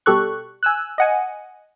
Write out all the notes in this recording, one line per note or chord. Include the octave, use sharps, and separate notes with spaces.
B2 G3 G4 A4 C#6 F#6
G#5 E6 F#6
D#5 F#5 G#5